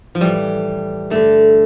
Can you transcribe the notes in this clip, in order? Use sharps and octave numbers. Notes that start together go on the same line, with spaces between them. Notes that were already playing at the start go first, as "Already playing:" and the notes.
F3
A2 E3 G3
G2 D3 A3